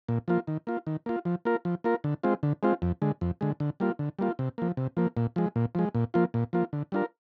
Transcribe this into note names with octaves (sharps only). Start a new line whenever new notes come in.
A#2
F3 A#3 F4
D#3
A#3 F4
D#3
A#3 F4
F3
A#3 F4 A#4
F3
A#3 F4 A#4
D3
G#3 C4 F4
D3
G#3 C4 F4
F2
D3 G#3
F2
D3 G#3
D3
G3 A#3 F4
D3
G3 A#3 F4
C3
F3 A#3
C3
F3 A#3
A#2
F3 G#3
A#2
F3 G#3
A#2
F3 A#3 F4
A#2
F3 A#3 F4
D3
G3 D4 F4 A#4